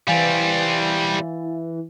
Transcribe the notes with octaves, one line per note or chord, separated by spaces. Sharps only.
E3 G3 C4 F5 G#5 A6